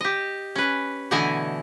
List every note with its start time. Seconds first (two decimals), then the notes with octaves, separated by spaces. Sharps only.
0.01 G4 D#5
0.55 C#4 B4
1.11 B2 D3 E3 A3 D#5 G#5